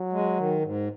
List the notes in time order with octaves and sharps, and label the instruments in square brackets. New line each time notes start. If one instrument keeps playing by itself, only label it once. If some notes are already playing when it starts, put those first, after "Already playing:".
Already playing: [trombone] F#3
[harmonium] G#3
D#3
G#2